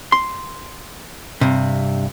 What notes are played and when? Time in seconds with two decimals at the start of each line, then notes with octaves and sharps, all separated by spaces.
0.12 C6
1.41 G2 C3